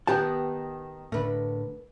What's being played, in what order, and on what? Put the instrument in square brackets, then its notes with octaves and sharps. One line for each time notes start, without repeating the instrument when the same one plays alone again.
[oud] D#3 B3 [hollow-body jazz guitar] G4 F#5 A5
[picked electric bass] A2 D3 [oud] A#4 B4